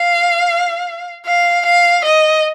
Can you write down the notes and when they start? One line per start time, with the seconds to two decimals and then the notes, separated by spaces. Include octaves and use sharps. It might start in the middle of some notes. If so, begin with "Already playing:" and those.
Already playing: F5
1.26 F5
1.65 F5
2.04 D#5